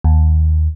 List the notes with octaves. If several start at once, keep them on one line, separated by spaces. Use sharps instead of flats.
D#2